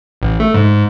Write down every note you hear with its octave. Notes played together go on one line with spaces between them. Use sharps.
A1
A3
G#2